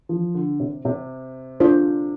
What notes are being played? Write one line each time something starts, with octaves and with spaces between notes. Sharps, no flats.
F3
D3
C3
C3
D4 F4 C5